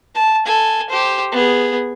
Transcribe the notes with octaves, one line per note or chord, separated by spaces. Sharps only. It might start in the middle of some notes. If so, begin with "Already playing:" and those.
A5
A4 G#5
G4 C5
B3 G#4